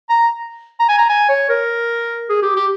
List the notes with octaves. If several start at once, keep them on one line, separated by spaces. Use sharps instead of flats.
A#5
A#5
G#5
A#5
G#5
C#5
A#4
G#4
G4
G4